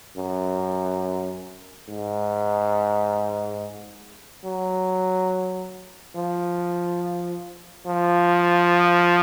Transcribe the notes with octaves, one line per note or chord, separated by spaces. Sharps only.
F#2
G#2
F#3
F3
F3